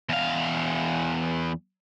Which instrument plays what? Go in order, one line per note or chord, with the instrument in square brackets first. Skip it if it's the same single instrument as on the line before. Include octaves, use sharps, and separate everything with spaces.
[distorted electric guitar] E2 F5